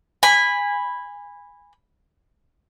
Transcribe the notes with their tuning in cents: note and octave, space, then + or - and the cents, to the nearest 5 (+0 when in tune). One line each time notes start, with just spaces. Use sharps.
G#5 -20 B5 +0